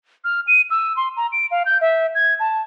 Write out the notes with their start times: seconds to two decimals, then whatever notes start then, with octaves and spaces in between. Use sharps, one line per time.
0.24 F6
0.47 D#7
0.70 E6
0.96 C6
1.16 A#5
1.32 D7
1.51 F5
1.65 G6
1.81 E5
2.15 G#6
2.40 A5